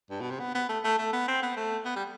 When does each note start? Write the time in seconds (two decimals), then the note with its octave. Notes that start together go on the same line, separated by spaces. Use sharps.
0.11 G2
0.21 B2
0.31 C3
0.40 B3
0.55 B3
0.69 A3
0.84 A3
0.99 A3
1.13 B3
1.28 C4
1.43 B3
1.57 A3
1.85 B3
1.96 G3